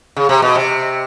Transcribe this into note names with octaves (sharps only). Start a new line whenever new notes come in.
C#3
C3
B2
C3